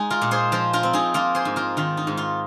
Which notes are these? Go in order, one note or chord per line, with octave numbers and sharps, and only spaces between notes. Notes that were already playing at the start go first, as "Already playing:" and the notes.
Already playing: G#3 D#4 G#4
F4 A#4
A#2
G#4 C5
F3 F4 A#4
F4 A#4
C4
D#4 G#4
A#3 F4 A#4
G#4 C5
G#2
F4 A#4
D#3 F4
D#4
G#2
F4